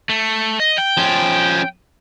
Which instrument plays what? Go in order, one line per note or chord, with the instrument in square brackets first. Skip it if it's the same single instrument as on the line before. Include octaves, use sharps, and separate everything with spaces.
[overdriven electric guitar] A3
D#5
G5
[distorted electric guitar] F3 C#4